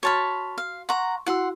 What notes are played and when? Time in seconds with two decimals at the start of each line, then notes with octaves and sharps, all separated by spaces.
0.03 F#4 C#5 A5 B5 C6 F6
0.58 F5
0.89 F#5 A#5 C6 C#6
1.26 E4 F#4 F#5 C6 E6